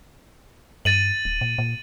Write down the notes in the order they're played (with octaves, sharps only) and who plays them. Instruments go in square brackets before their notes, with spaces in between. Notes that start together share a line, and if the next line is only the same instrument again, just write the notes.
[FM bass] G2 [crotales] A6 D#7 F#7
[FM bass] D1
A#2
A#2